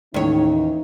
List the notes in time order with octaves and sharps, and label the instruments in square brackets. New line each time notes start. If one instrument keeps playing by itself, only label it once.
[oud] D#2 C#5 [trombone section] A2 [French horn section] E3 C#4 D#4